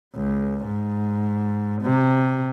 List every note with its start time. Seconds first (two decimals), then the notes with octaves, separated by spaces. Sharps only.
0.16 C#2
0.65 G#2
1.83 C3